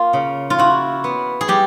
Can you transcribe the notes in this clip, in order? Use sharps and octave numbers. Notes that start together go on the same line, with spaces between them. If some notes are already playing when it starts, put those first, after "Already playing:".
Already playing: A#3 F4
C#3
F4
E4 F#4
B3
G#4
G3 G4